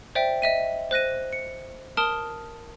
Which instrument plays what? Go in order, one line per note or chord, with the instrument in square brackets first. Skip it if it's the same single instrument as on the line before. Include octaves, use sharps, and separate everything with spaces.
[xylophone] C5 D5 E5 G5
D#5 E5 D#7
C5 F#6 A#6 D#7
C#7
A#4 A5 D#6 F6 D7 G7